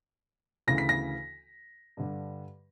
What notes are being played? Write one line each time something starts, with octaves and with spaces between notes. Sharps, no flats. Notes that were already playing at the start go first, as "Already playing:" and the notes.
D2 C#3 E3 A#6
B6
A#6
G2 D3 G3